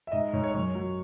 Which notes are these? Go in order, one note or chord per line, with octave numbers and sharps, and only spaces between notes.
E5
G#2 D#5
G#2 C#5
C#5
F#2 C#5
F#3